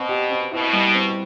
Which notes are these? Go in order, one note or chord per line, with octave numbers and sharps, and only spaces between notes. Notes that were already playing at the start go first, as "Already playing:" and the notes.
Already playing: B2 C4
G4
C4
B2 E4
G3
C4